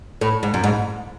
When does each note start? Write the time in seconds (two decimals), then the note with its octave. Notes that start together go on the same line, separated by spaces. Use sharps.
0.21 A2
0.43 G#2
0.54 F#2
0.64 G#2